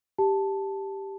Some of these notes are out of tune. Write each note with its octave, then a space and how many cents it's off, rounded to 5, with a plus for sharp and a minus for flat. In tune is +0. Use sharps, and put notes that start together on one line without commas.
G4 +0 A5 +0